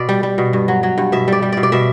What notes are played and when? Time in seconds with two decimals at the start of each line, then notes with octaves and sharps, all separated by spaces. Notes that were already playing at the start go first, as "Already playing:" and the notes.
Already playing: B2 D5
0.09 G3
0.23 G3
0.38 B2
0.53 G2
0.68 F#3
0.83 F#3
0.98 G2
1.12 B2 E5
1.28 G3 D5
1.42 G3
1.52 B2 D5
1.63 D5
1.72 B2 E5